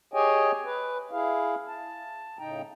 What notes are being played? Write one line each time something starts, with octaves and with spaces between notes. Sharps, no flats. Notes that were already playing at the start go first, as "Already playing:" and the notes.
G4 G#4 C#5 D#5 G5 G#5
B4
E4 G#4 F5
A5
A2 C#3 D#4 G5 A#5